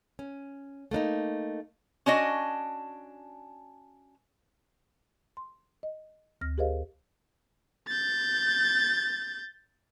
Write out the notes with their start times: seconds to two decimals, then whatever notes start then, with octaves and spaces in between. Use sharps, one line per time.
0.19 C#4
0.91 A3 A#3 D4 D#4
2.06 C#4 D4 F#4 D#5
5.37 C6
5.83 D#5
6.41 D2 F6 A#6
6.58 G4 G#4 A#4 C5 D#5 F5
7.87 G6 A6